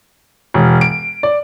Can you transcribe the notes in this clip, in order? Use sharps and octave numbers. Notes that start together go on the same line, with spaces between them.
E1
D7
D5